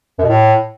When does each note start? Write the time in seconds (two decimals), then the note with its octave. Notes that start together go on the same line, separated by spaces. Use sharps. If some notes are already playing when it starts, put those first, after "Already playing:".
0.19 F#2
0.24 B2
0.29 A2